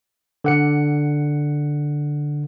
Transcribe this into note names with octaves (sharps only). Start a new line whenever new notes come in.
D3 F#5 C#7